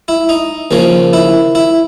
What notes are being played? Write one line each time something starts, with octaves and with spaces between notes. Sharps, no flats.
E4
D#4
D#2 C#3 F3
E4
E4